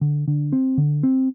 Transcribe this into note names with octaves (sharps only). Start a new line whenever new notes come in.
D3
D3
C4
D3
C4